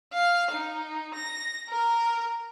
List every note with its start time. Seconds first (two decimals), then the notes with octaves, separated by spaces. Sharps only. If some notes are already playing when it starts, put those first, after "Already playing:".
0.13 F5
0.52 D#4
1.14 A#6
1.70 A#4